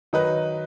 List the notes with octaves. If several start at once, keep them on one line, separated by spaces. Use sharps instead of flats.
D#3 F#3 D#4 B4